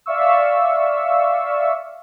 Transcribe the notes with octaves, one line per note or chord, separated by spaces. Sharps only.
D5 E5 F5 C#6 E6